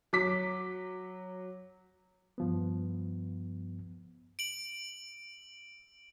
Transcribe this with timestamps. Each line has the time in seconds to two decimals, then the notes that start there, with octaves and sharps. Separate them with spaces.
0.13 F#3 D6 B6
2.38 G2 F3 B3
4.39 D7 F#7